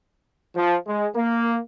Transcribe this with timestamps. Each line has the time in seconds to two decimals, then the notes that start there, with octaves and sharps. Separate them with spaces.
0.55 F3
0.86 G#3
1.16 A#3